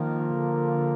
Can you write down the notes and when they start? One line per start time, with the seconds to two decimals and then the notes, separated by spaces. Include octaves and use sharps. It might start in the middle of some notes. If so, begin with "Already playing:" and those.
Already playing: D#3 F3 A#3 F4 A#4
0.33 D3